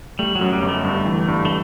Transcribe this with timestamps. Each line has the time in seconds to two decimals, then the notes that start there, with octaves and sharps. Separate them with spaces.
0.19 G3 A3
0.35 F#3
0.41 F#2
0.52 G3
0.62 G1
0.69 A3
0.85 G2
1.07 E3
1.28 G2
1.45 A3